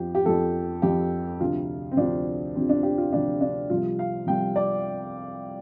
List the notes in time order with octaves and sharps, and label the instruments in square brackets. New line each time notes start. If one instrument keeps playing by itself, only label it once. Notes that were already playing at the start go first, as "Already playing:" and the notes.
Already playing: [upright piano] F2 F3 G4
G4
F2 F3 A4
F2 F3 G4
D2 C3 F3 F4
C4
D2 C3 F3 D4
D2 C3 F3 C4
D4
G4
F4
D2 C3 F3 D4
D4
C2 C3 F3 F4
F5
C2 C3 F3 G5
D5